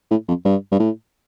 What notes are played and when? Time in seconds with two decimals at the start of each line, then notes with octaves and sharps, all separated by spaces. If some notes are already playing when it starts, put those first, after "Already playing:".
0.11 A2
0.28 F2
0.45 G2
0.72 G2
0.80 A2